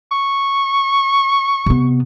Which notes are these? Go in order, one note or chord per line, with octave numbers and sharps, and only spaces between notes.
C#6
C3 B3